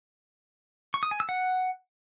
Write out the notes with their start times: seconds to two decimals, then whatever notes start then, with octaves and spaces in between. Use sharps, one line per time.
0.94 C#6
1.03 D#6
1.11 G#5
1.20 E6
1.29 F#5